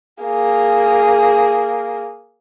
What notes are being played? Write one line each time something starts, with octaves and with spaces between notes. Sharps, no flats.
A#3 G#4